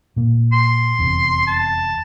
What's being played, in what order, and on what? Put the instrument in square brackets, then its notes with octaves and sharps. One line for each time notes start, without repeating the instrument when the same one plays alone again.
[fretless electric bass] A#2 A#3
[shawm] C6
[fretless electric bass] F1 E2 C3
[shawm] A5